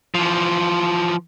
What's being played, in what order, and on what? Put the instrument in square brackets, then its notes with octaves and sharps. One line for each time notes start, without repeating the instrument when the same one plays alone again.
[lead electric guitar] E3 F3